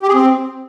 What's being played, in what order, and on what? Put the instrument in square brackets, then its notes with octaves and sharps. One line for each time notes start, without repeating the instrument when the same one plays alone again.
[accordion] G4
G#4
C4